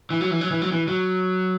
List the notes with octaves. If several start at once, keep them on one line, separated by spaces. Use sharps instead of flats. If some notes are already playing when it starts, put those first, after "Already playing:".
E3
F#3
E3
F#3
E3
F#3
E3
F#3